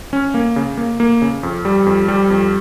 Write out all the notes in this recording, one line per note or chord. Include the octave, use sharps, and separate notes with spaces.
C#4
A#3
C#3
A#3
A#3
C#3
F2
G3
F2
G3
F2